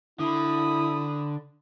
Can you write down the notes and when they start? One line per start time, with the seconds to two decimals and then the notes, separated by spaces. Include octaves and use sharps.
0.19 D3 E4 B5 D#6